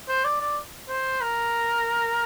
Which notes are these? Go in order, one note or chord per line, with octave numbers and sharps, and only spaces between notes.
C5
D5
D5
C5
A#4